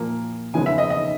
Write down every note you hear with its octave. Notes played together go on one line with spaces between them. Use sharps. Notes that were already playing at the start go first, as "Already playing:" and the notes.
Already playing: A#2 F3 A#3
C#3 F3 G#3 B3 G#5
E5
D#5
D#5